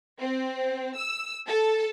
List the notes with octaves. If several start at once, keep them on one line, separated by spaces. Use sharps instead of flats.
C4
E6
A4